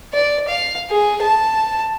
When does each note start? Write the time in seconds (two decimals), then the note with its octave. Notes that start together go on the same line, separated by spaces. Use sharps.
0.13 D5
0.48 F5
0.90 G#4
1.22 A5